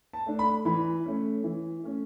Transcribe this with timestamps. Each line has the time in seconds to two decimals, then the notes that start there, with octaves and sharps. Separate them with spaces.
0.13 A5
0.26 A3 D4
0.39 B5
0.65 E3 B5
1.05 A3 C#4
1.44 E3
1.83 A3 C#4